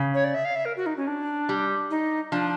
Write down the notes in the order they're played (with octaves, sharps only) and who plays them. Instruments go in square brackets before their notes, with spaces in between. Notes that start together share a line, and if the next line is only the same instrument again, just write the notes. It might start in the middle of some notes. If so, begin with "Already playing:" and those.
Already playing: [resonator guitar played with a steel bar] C#3
[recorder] C#5
D5
E5
F5
E5
A#4
F#4
D#4
C#4
D4
[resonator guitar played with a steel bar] G3
[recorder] D#4
[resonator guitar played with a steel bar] F3 [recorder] D4